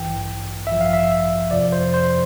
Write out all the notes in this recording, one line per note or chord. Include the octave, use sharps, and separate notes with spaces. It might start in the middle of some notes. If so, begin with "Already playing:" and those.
Already playing: A1 G2 E3 G5
A1 G2 F3 E5
F5
E5
F2 C3 F3 D5
C5
C5